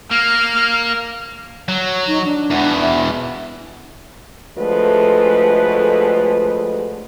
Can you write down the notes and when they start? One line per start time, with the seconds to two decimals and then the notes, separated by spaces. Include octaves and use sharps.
0.11 A#3 F6
1.68 F#3
2.07 D#4
2.25 D4
2.50 E2 B2
2.80 E5
4.57 D2 F3 G#3 A3 B4